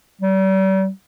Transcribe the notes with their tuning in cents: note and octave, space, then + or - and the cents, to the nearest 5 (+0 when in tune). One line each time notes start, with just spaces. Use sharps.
G3 -40